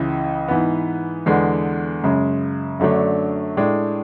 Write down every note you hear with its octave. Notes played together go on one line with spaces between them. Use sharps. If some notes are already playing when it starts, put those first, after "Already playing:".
Already playing: C#2 C#3 E3
G#2 E3 B3
E2 D3 G#3 B3
F#2 C#3 G#3
F#2 D3 F#3 A3 D4
A2 G#3 D4